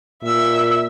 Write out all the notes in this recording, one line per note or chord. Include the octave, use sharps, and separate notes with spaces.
A#2 E5 E6